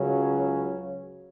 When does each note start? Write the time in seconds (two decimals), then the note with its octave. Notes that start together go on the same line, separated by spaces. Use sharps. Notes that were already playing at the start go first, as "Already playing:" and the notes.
Already playing: C#2 C#3 F#3 C#4